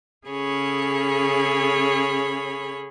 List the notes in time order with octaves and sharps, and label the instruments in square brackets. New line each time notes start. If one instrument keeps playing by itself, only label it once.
[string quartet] C#3 C#4 G#4 A4 C#5 B5